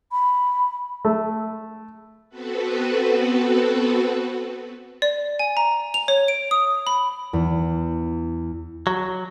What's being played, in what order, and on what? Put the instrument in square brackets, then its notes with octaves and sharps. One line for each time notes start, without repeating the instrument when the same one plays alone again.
[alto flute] B5
[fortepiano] A3
[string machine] B3 C4 F#4 A4 B4
[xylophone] D5
G#5
A#5
F7
C#5
D7
D#6
B5
[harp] E2
[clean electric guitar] F#3